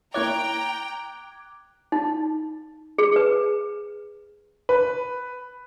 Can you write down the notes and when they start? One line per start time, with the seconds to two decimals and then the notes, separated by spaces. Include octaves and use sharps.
0.14 A#3 E4 C#5 G5 A#5 D6 F#6 G#6
1.92 D#4
2.98 G#4
3.16 B4
4.69 B4